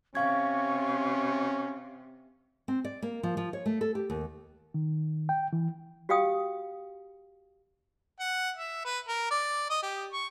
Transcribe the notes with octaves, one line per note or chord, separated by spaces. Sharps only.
C3 C#4 F5 C#6 G#6
C4
D5
A#3
F3
F3
C#5
A3
A4
G4
D#2
D#3
G5
E3
F#4 G4 F5 G5 D#6
F#5
E5
B4
A#4
D5
D#5
G4
C#6